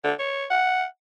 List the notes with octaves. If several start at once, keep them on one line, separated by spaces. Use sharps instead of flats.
D3
C#5
F#5